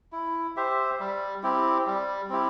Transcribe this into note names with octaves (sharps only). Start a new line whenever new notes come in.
E4
G4 C5 E5
G3
C4 E4 G4
G3
C4 E4 G4